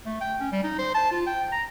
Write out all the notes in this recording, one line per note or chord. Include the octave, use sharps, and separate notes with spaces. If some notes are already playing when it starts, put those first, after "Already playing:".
A3
G5
C#4
G3
D#4
C5
A5
F4
G5
A#5